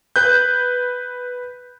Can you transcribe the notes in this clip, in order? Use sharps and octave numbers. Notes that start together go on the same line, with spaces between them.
B4 F#6 G6